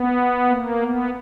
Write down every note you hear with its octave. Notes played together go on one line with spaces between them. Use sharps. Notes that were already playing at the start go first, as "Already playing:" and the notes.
Already playing: B3
A#3
B3